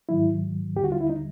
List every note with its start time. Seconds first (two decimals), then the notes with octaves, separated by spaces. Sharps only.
0.09 G#2 D#3 F#3 E4
0.75 D#2 D3 G3 G4
0.84 F#4
0.92 F4
1.01 E4
1.10 D#4